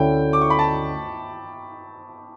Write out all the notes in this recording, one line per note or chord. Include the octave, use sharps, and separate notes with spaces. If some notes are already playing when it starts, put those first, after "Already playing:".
Already playing: D2 D3 A3 C#4 E4 G5
D6
C#6
B5
A5